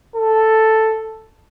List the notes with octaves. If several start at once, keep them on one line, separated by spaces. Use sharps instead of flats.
A4